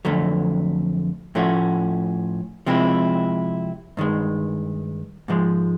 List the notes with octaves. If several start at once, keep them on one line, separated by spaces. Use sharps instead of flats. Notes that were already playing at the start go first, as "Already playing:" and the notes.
F2 D3 F#3 A3
A2 F3 A3 C#4 F#4
C3 F3 G#3 C4 E4
G2 D#3 G#3
G#2 F3 G#3